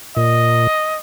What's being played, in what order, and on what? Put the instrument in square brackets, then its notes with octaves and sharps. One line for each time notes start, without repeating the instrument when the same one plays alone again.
[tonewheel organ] A#2 [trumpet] D#5